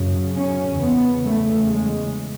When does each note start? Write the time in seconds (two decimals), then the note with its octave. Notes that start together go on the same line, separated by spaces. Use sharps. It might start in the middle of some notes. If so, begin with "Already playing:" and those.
Already playing: F#2 C#3
0.35 C#4
0.79 E2 C#3 B3
1.24 A3
1.68 G#3